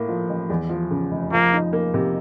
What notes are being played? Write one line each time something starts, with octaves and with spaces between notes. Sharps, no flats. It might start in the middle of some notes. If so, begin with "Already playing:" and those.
Already playing: A2 A#3
F3
A1
E2
F3
C#3
F1
F3 A#3
D#4
A#3
C3